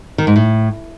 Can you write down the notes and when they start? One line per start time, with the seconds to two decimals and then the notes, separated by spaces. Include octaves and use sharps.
0.18 D#3
0.27 G#2
0.36 A2